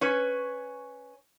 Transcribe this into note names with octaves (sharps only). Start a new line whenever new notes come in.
C#4 B4 C#5